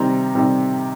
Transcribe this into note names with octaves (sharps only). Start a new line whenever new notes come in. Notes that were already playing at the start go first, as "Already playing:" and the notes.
Already playing: C3 D#3 G3 C4 A#5
C3 D#3 G3 C4